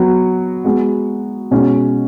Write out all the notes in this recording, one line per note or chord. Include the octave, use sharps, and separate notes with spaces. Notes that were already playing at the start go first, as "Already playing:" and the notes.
Already playing: F#3 B3 F#4
G#3 B3 F#4
B2 G#3 C#4 F#4